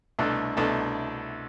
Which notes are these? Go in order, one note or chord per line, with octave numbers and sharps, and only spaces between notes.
C2 B2 A3 D4 A4
C2 B2 A3 D4 A4